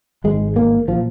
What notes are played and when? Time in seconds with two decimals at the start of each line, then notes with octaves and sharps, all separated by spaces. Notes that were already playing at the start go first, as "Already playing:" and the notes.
0.24 G#1 G#2 G#3
0.56 A#3
0.88 A#2 F3